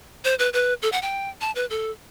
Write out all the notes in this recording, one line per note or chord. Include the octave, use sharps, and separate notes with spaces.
C5
B4
B4
A4
F#5
G5
A5
B4
A4